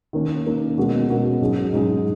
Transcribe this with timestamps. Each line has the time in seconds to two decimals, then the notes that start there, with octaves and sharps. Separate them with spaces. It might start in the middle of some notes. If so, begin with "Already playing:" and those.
0.13 D#3 A#3 C#4
0.46 D#3 A#3 C#4
0.77 B2 G#3 C#4 F#4 A#4
1.09 B2 G#3 C#4 F#4 A#4
1.41 G#2 F#3 C#4 G#4
1.73 G#2 F#3 C#4 G#4